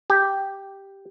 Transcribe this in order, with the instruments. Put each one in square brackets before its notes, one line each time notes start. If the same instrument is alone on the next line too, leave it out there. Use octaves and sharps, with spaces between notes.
[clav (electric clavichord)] G4